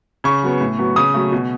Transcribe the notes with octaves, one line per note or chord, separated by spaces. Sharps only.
C#3 C#6
F#3 B3
A2
F#3 B3
C#3 D#6
F#3 A3
B2